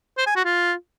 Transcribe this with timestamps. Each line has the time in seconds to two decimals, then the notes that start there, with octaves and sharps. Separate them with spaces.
0.17 C5
0.27 G#5
0.36 F#4
0.45 F4